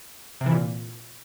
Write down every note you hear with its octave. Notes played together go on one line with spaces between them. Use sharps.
C3
E3
A#2